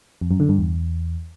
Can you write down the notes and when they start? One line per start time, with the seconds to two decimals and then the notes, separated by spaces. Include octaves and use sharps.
0.21 F2
0.31 F#2
0.40 D3
0.49 G2
0.58 E2